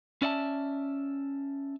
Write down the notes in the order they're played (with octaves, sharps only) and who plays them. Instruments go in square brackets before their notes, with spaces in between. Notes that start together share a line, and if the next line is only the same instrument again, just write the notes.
[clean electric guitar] C#4 D5 E5 F#5 A5